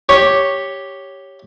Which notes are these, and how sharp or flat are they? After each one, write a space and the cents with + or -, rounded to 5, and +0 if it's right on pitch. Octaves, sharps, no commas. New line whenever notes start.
G4 +0 C#5 +0